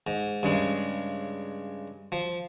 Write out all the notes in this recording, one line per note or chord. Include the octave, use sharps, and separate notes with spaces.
G#2
G2 C#3 G#3
F3